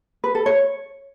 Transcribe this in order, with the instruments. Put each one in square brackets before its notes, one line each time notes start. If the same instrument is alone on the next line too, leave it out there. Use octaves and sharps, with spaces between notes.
[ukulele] B4
A4
C#5